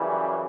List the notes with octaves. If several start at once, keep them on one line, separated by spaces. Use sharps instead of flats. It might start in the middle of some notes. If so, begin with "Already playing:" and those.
Already playing: F#2 C#3 E3 G3